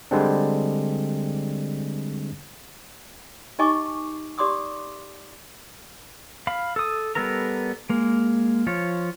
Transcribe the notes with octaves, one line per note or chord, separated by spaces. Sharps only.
D3 G3 G#3 C4 D4
D#4 G4 D#5 G#5 C#6 D6
G4 D5 C6 D6 D#6
F5 B5
A4 D#6
G3 B3 A4 A#4 A#5
G#3 A#3
F3 F4 C#5